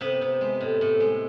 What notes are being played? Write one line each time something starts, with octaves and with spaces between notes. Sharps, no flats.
C3 B3 B4
C3
G#3
A2
A2
G#3